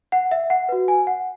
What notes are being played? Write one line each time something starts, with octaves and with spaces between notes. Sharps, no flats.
F#5
E5
F#5
F#4 B4
G#5
F#5